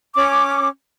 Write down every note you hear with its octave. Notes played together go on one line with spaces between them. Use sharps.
C#4 D6